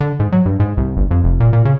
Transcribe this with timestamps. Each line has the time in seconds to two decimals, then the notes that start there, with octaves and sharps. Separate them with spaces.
0.01 D3
0.20 G#2
0.32 F#3
0.46 G2
0.60 G#2
0.77 C2
0.97 G1
1.11 F2
1.24 F1
1.40 A#2
1.53 A#2
1.65 C#3